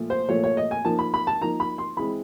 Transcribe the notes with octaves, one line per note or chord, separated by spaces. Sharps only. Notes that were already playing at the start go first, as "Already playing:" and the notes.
Already playing: A#2 F3 A3
C5
A#2 F3 A3 C#5
C#5
D#5
G#5
F3 A#3 D#4 A5
B5
B5
A5
F3 A#3 D#4 A#5
B5
C6
E3 G#3 C4 B5